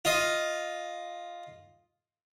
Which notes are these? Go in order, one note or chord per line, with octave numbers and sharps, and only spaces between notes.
F4 D#5